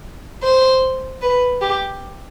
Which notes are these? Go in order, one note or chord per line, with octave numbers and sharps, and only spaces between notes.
C5
B4
G4